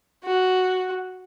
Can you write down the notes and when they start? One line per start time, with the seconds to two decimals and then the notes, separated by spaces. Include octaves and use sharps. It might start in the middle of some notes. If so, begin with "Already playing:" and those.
0.24 F#4